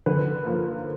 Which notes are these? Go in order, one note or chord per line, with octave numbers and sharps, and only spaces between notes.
D3 B4
F3 A#3